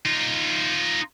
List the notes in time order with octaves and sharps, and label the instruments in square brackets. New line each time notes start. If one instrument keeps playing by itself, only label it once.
[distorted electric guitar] D#4 F4